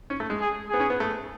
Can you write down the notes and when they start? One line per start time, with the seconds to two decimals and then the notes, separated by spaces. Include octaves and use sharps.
0.10 C#4
0.20 A3
0.30 G#3
0.40 G#4
0.69 B3 G#4
0.80 C#4
0.90 B3
1.00 A3